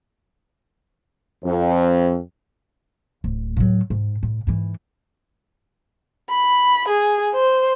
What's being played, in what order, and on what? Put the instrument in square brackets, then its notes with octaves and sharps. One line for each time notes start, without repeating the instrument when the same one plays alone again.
[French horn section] F2
[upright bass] D1
A2 F#3
G#2
A2
G#2 E3
[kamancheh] B5
G#4
C5